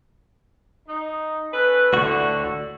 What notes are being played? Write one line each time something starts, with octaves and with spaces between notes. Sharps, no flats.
D#4
C#4 A4 B4
D2 A2 D3 F#4